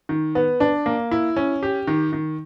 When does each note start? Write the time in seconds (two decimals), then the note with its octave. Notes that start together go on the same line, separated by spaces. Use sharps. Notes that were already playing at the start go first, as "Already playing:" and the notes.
0.09 D#3
0.35 B3
0.60 D4
0.86 A#3
1.11 E4
1.36 C#4
1.63 G4
1.87 D#3
2.13 D#3